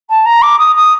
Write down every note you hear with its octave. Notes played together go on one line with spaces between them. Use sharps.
A5
A#5
D6
D#6
D#6